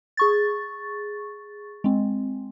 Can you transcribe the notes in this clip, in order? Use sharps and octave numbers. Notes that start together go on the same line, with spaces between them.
G#4 C#6 A6
G#3 C4